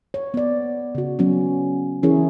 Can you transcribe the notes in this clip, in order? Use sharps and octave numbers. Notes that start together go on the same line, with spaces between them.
C#5
B3 D5
C#3 F#4
F#3 B3 C#4
E3 C#4 E4 G#4 A#4 C#5